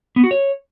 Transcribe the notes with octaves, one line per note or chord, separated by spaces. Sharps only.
B3
F#4
C#5